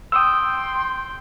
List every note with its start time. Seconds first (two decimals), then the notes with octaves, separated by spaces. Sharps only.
0.12 G5 C6 D#6 E6